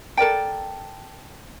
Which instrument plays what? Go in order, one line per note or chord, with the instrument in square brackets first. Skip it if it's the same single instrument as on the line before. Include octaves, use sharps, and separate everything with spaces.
[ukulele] A4 A#4 D5 G5